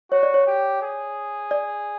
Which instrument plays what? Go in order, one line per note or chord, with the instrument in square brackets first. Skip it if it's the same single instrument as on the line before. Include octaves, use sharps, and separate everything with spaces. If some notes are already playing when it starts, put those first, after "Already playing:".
[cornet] F#4 [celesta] C#5
[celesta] D5
C#5
[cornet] G4
G#4
[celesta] D5